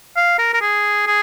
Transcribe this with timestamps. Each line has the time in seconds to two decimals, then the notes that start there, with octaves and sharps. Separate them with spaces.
0.16 F5
0.39 A#4
0.53 A#4
0.61 G#4
1.07 G#4